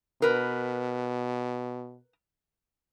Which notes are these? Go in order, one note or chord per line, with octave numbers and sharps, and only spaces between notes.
B2 A#4 B4